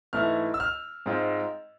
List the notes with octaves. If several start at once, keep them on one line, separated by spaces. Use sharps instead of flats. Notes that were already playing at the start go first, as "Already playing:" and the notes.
G#2 E3 A3 E4 F6
E6
F6
G#2 G#3 C4 F4